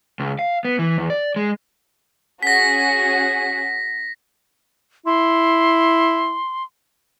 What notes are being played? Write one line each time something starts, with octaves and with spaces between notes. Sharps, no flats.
C#2
F5
B3
E3
E2
D5
G#3
C#4 F#4 G#4 A#6 B6
E4 C6